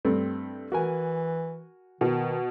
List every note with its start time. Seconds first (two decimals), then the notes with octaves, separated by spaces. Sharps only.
0.05 G2 A3 C4
0.72 E3 F#4 A#4 G#5
2.01 B2 D#3